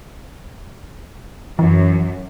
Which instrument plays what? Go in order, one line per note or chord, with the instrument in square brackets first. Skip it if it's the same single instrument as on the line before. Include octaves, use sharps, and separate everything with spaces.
[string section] F#2 [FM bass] E3